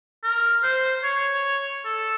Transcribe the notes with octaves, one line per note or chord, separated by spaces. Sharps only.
A#4
C5
C#5
A4